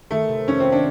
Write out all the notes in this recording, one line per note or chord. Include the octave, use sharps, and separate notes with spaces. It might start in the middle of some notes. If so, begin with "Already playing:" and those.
D#3 A3
C3
F2 C#4
C4
D4